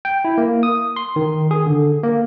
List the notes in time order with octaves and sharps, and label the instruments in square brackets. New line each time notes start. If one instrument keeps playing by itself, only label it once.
[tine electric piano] G5
E4
A#3
D#6
C6
D#3
G#4
D3
A#3